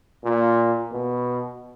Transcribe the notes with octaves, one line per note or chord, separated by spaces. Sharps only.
A#2
B2